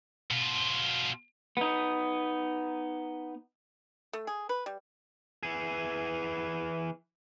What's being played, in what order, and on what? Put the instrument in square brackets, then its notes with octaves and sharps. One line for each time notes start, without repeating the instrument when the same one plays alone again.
[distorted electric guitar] B2 F4
[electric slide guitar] B3 D#4
[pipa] A3
G#4
B4
G3
[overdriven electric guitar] E3 G#4